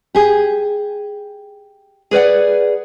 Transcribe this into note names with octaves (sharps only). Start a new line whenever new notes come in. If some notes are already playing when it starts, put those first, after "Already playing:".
G4 G#4
G#4 B4 D5 F#5